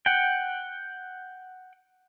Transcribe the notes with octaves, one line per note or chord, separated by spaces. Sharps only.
F#5 G5